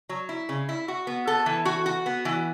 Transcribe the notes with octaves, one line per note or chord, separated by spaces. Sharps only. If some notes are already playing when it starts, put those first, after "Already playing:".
F#3
E4
C#3
E4
F#4
B3
A4
E3
F#4
F#4
B3
E3